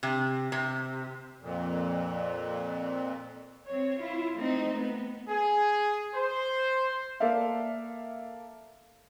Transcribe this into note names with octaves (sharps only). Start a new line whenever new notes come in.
C3
C3
F2 A#2
C4 C#5
E4 F4
A3 C4 D#4
B3
G#4
C5
A#3 A4 D5 E5 F5